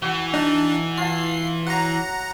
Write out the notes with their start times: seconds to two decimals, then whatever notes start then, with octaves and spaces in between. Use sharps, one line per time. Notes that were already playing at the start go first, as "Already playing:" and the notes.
0.02 E3 F#4 F#5
0.34 D4 D#4
0.97 F4 F5 A5 C7
1.67 F#3 F#5 A#5